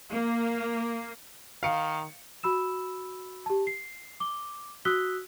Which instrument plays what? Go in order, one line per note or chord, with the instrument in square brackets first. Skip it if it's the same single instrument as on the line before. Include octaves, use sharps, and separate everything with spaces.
[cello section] A#3
[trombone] D#3 [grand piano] F5 C#7
[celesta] F#4 B5 E6 E7
G4 A5
C7
D6 G7
F#4 D#6 E6 F#6 B6 G7